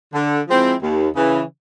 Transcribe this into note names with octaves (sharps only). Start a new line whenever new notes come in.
D3
F3 G#3 C4 E4
D#2
C#3 E3